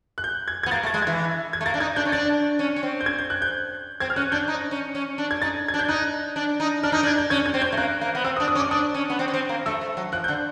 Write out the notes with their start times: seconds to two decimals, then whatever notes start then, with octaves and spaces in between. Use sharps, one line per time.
0.18 F#6
0.24 G6
0.48 G#6
0.63 G#6
0.66 B3
0.71 A#3 A6
0.83 A3
0.87 A6
0.94 G#3
1.02 E3 G#6
1.53 G#6
1.61 A3
1.66 A#3 A6
1.74 D4
1.80 D#4 G#6
1.96 D4 G6
2.06 C#4
2.12 D4 A6
2.59 C#4
2.76 C#4
2.83 C4
3.01 G6
3.06 G#6
3.18 G6
3.30 F#6
3.42 G6
4.00 C4 G#6
4.10 F6
4.16 C#4 F#6
4.32 D4 G6
4.48 D#4
4.71 C#4
4.95 C#4
5.18 D4
5.31 G#6
5.42 D#4 A6
5.68 G#6
5.74 D4
5.79 G6
5.88 D#4 F#6
6.36 D4
6.60 D#4
6.83 D4 F6
6.92 D#4 G6
7.03 D4
7.07 G#6
7.18 G6
7.30 C#4 G#6
7.46 G#6
7.54 C4
7.61 G6
7.72 A3
7.77 A#3 F#6
8.01 A#3
8.15 B3
8.24 C4 E6
8.37 D#6
8.40 D4
8.48 D#6
8.55 C#4
8.60 D6
8.71 D4 D#6
8.94 C#4
9.10 B3
9.19 C4
9.28 C#4
9.34 C4
9.49 A#3
9.66 A3 E6
9.81 A3
9.97 F#3
10.12 F3 F#6
10.24 D3 G6